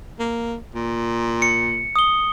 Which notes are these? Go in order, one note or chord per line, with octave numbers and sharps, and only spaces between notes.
A#3
A#2
C#7
D#6 G7